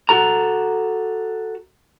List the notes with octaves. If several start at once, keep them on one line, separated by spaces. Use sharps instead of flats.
F#4 A4 A#5